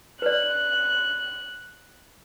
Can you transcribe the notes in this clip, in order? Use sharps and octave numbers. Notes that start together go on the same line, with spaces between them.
B4 D5 F#6